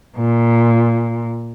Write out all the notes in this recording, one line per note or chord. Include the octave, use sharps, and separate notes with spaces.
A#2